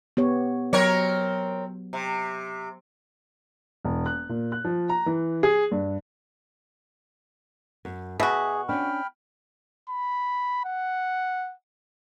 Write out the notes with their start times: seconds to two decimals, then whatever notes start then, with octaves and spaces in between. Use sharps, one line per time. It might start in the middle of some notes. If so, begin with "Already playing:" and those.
0.17 B3 G4 C#5
0.73 F#3 C4 A#4 C#5
1.93 C3
3.85 E1
4.06 F#6
4.29 A#2
4.52 F#6
4.64 F3
4.89 A#5
5.06 E3
5.43 G#4
5.71 G2
7.85 F#2
8.20 B2 F#4 G#4 E5
8.69 C#4 D4 G5 B5 F6
9.89 B5
10.65 F#5